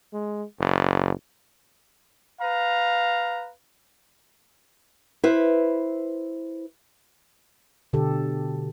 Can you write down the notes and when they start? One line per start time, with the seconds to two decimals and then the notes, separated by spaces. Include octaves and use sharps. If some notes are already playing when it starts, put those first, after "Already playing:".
0.13 G#3
0.60 F#1
2.41 B4 F5 A#5
5.23 E4 B4 C5
7.93 B2 D3 G4 A4